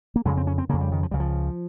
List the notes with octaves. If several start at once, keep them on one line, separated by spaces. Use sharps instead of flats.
A#3
F2 C#3 G#3
C4
C#4
C4
F2 C#3 A#3
G3
D#3
F3
C#2 C#3 G3
F3